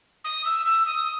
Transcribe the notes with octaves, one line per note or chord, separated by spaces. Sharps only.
D#6
E6
E6
D#6